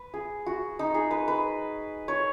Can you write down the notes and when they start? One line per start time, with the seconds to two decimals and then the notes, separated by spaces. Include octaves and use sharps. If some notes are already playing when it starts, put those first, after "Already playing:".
Already playing: B4
0.14 G#4
0.46 F#4
0.79 D#4
0.94 G#4
1.11 B4
1.28 B4
2.08 C#5